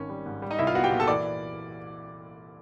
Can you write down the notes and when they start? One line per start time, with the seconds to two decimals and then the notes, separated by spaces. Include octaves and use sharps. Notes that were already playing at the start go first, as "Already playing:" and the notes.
Already playing: G#1 D#3 C#4
0.09 G3
0.26 G#2
0.42 G3
0.50 D#4 D#5
0.59 C2 E4 E5
0.67 F4 F5
0.75 B3 F#4 F#5
0.84 G4 G5
0.91 A#2
1.00 A4 A5
1.07 E3 D5 D6